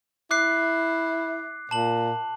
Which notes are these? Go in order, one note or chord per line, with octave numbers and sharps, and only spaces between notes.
E4 D6 F#6 C7
A#2 A5 F#7